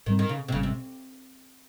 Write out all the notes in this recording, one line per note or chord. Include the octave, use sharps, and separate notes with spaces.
G#2 D#3 G3 C4
D#3
C#3
C3
G#1 G#2 C#3 G3 C#4
C3